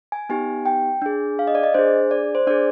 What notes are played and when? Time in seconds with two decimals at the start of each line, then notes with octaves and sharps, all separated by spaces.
0.12 G#5
0.29 B3 D#4 G4 G#5
0.66 G5
1.02 D4 G#4
1.39 F5
1.47 D#5
1.55 D5
1.63 D#5
1.74 D4 G#4 C5
2.11 D5
2.35 C5
2.47 D4 G#4 D5